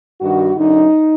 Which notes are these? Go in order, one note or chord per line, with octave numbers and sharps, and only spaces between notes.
G2 D#3 F#4
F#2 D3 D#4